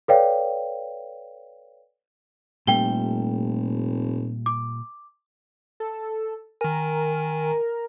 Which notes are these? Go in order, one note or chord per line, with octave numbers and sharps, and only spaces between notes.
A4 B4 C#5 D5 F5 G5
F1 A#2 G3 A3 G5 G7
D6
A4
D#3 A#4 G#5